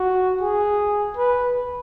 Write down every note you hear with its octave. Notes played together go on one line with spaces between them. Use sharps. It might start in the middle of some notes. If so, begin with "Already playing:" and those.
Already playing: F#4
G#4
B4